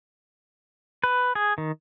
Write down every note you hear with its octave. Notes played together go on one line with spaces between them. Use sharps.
B4
G#4
D#3